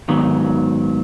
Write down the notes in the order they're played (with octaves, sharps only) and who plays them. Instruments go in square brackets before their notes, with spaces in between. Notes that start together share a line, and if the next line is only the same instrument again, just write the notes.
[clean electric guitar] G#2 D#3 F#3 B3